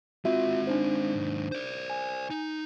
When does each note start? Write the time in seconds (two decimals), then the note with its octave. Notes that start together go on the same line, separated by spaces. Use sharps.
0.25 G#3 C4 F4 F#4 E5
0.67 D4 D#4 C5
1.15 D#2 G#2
1.52 C5 D5
1.90 G#5
2.30 D#4